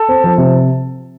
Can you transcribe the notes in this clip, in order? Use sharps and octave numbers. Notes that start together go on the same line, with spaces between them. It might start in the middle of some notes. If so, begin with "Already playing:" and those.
Already playing: A4
C4
F3
C3